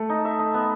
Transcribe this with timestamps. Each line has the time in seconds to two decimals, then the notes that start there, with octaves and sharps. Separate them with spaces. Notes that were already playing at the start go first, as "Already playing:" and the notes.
Already playing: A3 A4
0.10 D#4
0.25 E5
0.39 D#4
0.54 B3